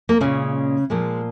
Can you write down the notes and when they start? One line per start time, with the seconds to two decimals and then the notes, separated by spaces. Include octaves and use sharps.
0.09 A#3
0.21 A#2 C#3 G#3 C#4
0.90 A#2 F3 G#3